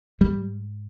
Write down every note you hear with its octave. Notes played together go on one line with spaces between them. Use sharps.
G#2 G3